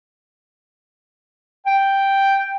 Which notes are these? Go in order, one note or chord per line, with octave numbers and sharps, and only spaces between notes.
G5